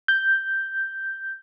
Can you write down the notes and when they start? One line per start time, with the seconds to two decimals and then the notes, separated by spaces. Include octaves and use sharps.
0.08 G6